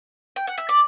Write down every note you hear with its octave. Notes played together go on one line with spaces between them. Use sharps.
G5
F#5
E5
D5